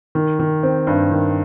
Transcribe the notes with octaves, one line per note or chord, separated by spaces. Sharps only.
D#3
D#3
C4
G2
D#3